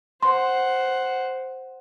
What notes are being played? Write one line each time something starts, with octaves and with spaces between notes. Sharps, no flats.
C5 F#5 C6